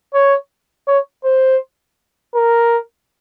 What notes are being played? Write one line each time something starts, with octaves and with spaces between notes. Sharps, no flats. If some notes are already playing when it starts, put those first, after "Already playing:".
C#5
C#5
C5
A#4